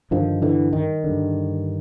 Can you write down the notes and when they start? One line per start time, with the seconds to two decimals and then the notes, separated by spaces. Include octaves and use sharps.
0.11 G2 D3 D#3 F3
0.42 D3 E3
0.73 D#3
1.04 G2 D3